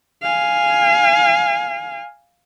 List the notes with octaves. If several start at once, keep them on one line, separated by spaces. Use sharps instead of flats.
F5 G#5